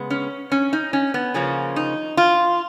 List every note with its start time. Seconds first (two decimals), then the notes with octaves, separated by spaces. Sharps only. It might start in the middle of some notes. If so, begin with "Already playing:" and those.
Already playing: C#3 G#3 B3
0.10 C#4
0.52 C#4
0.73 D#4
0.93 C#4
1.14 B3
1.34 C#3 F3 A#3 C#4
1.76 D#4
2.17 F4